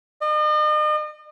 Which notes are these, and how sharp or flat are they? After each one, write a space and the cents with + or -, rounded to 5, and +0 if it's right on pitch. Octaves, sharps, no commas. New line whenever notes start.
D#5 -40